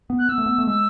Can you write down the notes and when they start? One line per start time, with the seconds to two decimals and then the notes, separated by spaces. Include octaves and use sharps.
0.10 B3
0.18 F#6
0.29 B3 E6
0.38 A3
0.46 B3
0.58 A3
0.67 G#3 E6